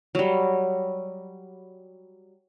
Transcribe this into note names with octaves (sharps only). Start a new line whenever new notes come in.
F#3 G3